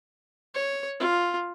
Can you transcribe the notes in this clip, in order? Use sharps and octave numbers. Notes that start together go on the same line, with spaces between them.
C#5
F4